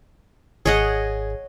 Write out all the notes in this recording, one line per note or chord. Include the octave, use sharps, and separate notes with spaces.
G#1 G#4 C#5 D#5 F#5